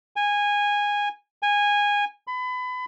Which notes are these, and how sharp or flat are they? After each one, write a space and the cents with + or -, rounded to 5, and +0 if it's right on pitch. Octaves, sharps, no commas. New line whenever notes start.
G#5 -15
G#5 -15
B5 +30